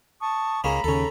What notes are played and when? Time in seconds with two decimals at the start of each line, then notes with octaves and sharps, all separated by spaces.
0.20 A5 C#6 D#6
0.64 C#2 G#3 A#3 C#4 A#5 B5
0.84 D#2 C#3 C#4 A4